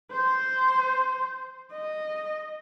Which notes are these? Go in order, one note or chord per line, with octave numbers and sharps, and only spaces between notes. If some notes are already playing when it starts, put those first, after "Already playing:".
C5
D#5